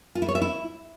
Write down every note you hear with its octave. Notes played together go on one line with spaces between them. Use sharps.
F4
E4
C#5
E5
E4